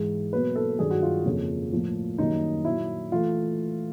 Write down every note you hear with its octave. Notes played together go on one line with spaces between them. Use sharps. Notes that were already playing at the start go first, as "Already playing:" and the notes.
Already playing: G#2 E3 G#3
B2 F#3 A#3 B4
A4
G2 D#3 F#3 G#4
F#4
F4
F2 C#3 F3 A#3
A2 F3 A#3
F#2 D#3 G3 A#3 D#4
A#2 F#3 A#3 E4
E3 A3 F4